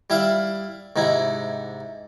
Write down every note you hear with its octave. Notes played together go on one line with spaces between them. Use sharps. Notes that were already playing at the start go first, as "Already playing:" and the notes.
G3 E4 E5 F5
G#2 C3 D#4 E4